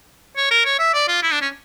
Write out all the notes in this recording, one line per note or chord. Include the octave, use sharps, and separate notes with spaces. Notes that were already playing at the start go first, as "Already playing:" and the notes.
C#5
A#4
C#5
E5
D5
F4
E4
D4
C#4